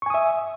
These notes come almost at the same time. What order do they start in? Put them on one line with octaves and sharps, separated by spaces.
C#6 G#5 D#6 E5